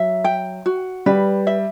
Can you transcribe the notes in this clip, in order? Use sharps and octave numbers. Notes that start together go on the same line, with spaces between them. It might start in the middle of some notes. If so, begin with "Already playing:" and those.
Already playing: F#3 E5
G5
F#4
G3 B4
E5